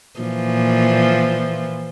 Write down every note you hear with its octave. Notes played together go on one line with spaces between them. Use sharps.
A#2 E3 F3